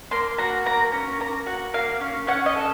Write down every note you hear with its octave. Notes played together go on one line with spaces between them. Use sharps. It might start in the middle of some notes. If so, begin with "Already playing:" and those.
A#3 C6
F#4 A#5
A#3 A#5
C#4
A#3 A#5
F#4 F#5
A#3 F5
C#4
C#4 F#5
D#5
A4